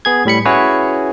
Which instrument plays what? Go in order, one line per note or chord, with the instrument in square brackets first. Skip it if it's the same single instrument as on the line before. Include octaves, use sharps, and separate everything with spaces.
[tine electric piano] B3 G#4 G#6
A2 G3 B5 C#7
C#4 E4 F#4 G#4 B4 C#5